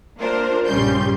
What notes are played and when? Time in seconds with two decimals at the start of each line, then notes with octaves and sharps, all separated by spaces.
0.19 A#3 D4 F4 A#4 C5
0.66 A#1 G2 C#3 G3 C6 G6